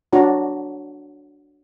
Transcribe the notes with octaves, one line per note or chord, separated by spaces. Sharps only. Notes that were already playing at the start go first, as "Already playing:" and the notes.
D4 F#4 C#5 A#5